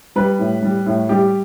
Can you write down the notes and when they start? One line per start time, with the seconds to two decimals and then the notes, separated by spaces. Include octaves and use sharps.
0.16 G3 B4
0.39 A2
0.62 G3
0.86 A2
1.09 G3 G4